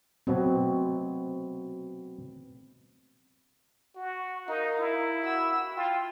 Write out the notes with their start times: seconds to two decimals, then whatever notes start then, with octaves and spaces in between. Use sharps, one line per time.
0.27 B2 F#3 A3 C4
3.96 F#4
4.48 D#4 A#4 F5
4.79 E4
5.23 F#4 E6
5.76 F4 G5